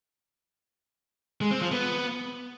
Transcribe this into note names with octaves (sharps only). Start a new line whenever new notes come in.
G#3
C4
F3
B3